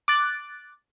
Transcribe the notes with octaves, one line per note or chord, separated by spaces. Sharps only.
D6 F#6 A6